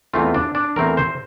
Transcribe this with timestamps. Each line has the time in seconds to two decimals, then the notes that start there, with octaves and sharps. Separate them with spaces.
0.13 E2 E3 A3 C4 F4
0.34 D4
0.55 D4
0.76 E2 E3 A3 C4 A#4
0.97 C5